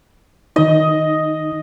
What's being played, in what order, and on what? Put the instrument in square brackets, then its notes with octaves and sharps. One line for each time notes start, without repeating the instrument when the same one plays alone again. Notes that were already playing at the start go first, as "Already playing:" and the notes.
[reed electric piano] D#3 D#4 [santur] D#5